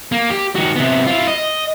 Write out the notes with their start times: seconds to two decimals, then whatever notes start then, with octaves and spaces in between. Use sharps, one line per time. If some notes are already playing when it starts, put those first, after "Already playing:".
0.12 A#3
0.30 G4
0.55 D#3 F#4
0.76 C3 B3
1.06 E4 F4
1.28 D#5